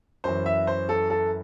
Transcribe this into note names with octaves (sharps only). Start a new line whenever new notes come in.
F#2 E3 C5
E5
C5
A4
A4